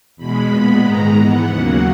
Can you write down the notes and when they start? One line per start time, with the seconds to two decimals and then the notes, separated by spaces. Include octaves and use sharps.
0.17 E2 B2 G#3 B5
0.50 A#2 G#3 B3
0.82 G#2 D#3 G#3 A#5
1.16 G#2 E3 B3 F#5
1.48 D#2 C#3 F#3 A#3 F#5